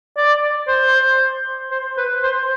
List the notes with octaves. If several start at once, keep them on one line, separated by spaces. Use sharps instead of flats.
D5
C5
C5
B4
C5